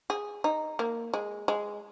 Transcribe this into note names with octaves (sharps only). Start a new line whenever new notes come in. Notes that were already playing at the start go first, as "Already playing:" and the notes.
G#4
D#4
A#3
G#3
G#3